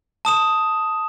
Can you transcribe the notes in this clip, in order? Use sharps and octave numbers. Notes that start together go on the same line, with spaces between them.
A5 D#6 E7